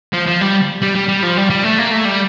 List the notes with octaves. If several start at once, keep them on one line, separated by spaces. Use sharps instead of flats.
F3
F3
G3
G3
G3
G3
F3
G3
G3
A3
A#3
A3
G3